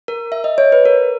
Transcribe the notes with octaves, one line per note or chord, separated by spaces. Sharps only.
A#4
E5
D#5
C#5
B4
A#4